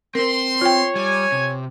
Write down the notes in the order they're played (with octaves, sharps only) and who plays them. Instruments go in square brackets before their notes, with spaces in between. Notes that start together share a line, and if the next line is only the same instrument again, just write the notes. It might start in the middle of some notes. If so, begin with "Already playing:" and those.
[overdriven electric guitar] C4 C5 [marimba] A#4 [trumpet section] C6
[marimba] F4 G5 [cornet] C#5
[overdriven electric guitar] G3 [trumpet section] G#5
[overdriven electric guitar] C3